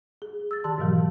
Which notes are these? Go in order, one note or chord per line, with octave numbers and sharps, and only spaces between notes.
G#4
E6 A6
D#3 G4 A5 C6
G#2 B2 E3 F#3